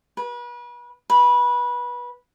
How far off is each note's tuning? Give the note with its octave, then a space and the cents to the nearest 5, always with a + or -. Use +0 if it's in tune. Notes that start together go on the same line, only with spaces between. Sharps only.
B4 -35
B4 -20